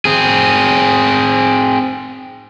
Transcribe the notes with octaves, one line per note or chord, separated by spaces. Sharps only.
C4 G#4